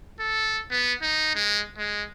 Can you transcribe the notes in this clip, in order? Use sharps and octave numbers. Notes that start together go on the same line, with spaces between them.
A4
B3
D#4
G#3
G#3